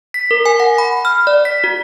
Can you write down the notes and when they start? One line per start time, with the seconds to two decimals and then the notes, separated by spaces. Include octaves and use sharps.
0.14 B6
0.31 A#4
0.46 G#5
0.60 F#5
0.78 B5
1.05 F6
1.27 D5
1.45 B6
1.64 F#4